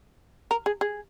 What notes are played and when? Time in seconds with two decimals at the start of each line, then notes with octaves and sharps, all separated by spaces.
0.51 A#4
0.66 G#4
0.81 G#4